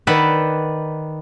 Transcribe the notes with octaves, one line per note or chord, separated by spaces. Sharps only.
D#3 B4 D5 E5 F#5